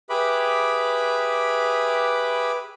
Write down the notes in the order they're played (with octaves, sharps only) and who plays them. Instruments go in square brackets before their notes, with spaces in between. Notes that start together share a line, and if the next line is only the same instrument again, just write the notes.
[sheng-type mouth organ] G4 G#4 B4 E5 B5 D6